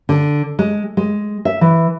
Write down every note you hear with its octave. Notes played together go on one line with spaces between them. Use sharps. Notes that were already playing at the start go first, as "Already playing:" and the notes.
D3
G#3
G#3
E5
E3